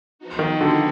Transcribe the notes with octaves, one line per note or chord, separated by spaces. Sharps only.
F3 B3 D#4 F#4
D#3
D3